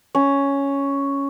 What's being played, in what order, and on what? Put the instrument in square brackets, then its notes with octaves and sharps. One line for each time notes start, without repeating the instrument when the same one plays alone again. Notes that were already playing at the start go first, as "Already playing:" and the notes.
[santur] C#4